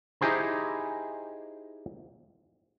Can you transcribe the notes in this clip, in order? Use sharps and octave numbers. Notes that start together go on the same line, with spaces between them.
D#4 E4 G4 G#4 C5 A#5